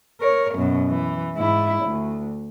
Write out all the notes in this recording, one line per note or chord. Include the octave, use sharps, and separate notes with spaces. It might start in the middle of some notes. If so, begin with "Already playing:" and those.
A#4 C#5
F#2 B2
E3
G#2 E4
D2